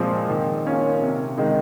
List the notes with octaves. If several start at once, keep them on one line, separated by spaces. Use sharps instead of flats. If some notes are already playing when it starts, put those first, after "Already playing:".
Already playing: A#2 F3 G#3 C4
D#3
A#3 C#4 F4
C3
D#3 G#3 D#4